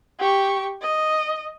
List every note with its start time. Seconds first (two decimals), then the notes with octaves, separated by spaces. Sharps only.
0.19 G4 C#6
0.82 D#5